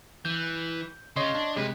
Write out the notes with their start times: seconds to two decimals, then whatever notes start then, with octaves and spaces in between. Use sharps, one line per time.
0.25 E3 G6
1.16 C#3 F4 C#5 D#5 C6
1.35 D4
1.56 C#2 C3 G#3 B4